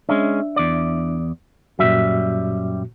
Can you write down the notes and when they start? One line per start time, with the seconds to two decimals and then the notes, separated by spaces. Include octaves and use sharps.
0.09 G#3 C#4 D4 E5
0.56 E2 D5
1.79 F#2 A#2 G3 F#4 E5